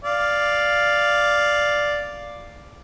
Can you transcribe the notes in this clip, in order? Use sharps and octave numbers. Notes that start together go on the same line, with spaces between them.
D5 F5